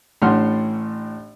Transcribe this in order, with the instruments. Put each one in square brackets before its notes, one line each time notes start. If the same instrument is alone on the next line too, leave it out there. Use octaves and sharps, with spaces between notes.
[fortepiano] A1 A2 D4 F#5 C6 F6